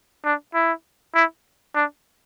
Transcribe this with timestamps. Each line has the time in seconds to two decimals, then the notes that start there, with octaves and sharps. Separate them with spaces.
0.25 D4
0.54 E4
1.15 E4
1.75 D4